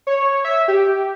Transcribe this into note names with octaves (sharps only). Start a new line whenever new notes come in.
C#5
E5
G4